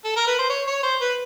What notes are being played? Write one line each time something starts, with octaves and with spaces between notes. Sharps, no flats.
A4
A#4
B4
C5
C#5
C#5
C5
B4